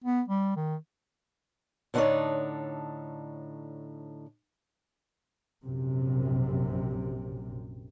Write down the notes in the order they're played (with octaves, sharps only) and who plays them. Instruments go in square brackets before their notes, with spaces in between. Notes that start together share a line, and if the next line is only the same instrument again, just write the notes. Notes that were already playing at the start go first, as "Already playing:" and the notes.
[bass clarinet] B3
G3
D#3
[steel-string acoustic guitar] A2 D3 D4 D#4 C#5 D5
[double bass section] A#1 F#2 C3